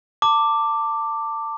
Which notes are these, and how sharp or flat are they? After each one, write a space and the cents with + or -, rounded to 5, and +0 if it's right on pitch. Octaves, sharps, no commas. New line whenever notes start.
A5 +30 D6 +0